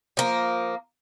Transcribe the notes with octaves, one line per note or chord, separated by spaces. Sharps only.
F3 A#3